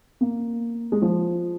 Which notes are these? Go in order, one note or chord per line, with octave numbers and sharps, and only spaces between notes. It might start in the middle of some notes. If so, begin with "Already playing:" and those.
A#3
G#3
F3